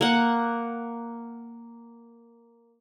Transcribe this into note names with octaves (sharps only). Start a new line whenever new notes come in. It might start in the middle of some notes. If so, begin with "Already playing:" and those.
A#3 F#5